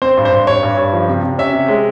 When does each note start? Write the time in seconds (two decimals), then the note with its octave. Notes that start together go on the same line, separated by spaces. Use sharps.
0.02 C4 C5
0.17 G2
0.25 C5
0.32 G2
0.47 G2 C#5
0.63 G2
0.77 G2
0.93 F3
1.08 C3
1.23 C3
1.39 C#4 E5
1.53 C3
1.68 G#3